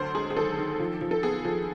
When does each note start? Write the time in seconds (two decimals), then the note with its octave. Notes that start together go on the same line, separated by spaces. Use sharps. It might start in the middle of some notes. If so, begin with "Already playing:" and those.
Already playing: D2 F#3 C5
0.15 G#3 G#4
0.30 G#4
0.36 D#3 A4
0.58 D#3
0.80 F3
1.01 F3
1.11 A4
1.23 B3 G#4
1.45 F3